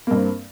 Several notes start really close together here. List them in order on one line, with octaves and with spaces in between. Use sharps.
A#3 G2 C4